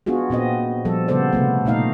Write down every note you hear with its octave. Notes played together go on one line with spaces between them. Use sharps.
B3 D4 F4 F#4 G#4
A#2 B3 C4 D#5
F3 G3 A4
C#3 G3 B3 A4 C5 D5
C3 A3 B3
A#2 A3 D#4 F5